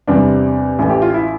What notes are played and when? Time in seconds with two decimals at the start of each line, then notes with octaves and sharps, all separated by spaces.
0.07 E2 C3 G3 C4 D4
0.79 A1 A2 E3
0.89 G4
1.02 F4
1.14 E4